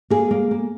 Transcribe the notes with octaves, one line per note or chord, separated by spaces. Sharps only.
A#3 G#4
A#3
A#3